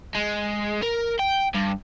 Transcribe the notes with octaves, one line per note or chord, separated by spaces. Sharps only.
G#3
A#4
G5
G2